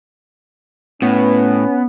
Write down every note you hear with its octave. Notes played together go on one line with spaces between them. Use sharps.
A2 B3 C#4